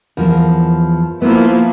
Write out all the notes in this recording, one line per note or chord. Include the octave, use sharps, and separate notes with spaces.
E2 F3 A#4
F3 A#3 B3 E4